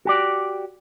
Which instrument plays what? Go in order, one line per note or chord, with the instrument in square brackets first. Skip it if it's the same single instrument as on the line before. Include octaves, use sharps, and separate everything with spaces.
[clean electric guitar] F#4 G4 D5